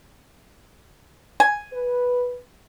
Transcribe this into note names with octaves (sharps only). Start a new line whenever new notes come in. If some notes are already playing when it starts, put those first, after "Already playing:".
G#5
B4